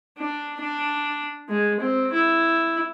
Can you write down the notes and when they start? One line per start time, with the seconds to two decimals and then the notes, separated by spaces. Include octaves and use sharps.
0.17 D4
0.60 D4
1.48 G#3
1.80 C4
2.13 E4